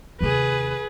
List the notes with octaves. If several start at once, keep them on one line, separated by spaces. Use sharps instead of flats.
D#2 C3 G#4 B4